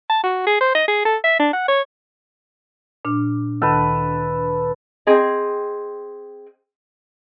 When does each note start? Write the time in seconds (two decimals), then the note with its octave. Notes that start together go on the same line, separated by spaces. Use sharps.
0.10 A5
0.23 F#4
0.46 G#4
0.61 C5
0.75 D#5
0.88 G#4
1.05 A4
1.24 E5
1.39 D4
1.53 F#5
1.68 C#5
3.05 A#2 D4 F6
3.62 D2 D#3 A4 B4
5.07 C4 G#4 D#5